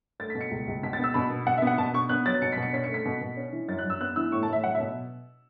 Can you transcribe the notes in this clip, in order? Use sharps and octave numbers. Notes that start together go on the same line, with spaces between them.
A3 A6
B6
B2
C#7
C#2
C#2
B2 B6
A6
B3 E6
B2 B5
B3
B2 F#5
E5
B3
F#5
B2 A5
B3 C#6
B3 F#6
F#3 A6
B2 C#7
B6
B2
C#7
C#4 B6
C#7
A3
B6
B2
B2
C#4
E3
F#2 A6
F#6
F#2
E6
B3 F#6
E3 E6
A2 C#6
A5
A2 E5
F#3 F#5
E5
B2